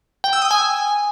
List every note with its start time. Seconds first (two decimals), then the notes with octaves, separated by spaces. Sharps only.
0.24 G5
0.33 E6
0.42 D#6
0.51 G#5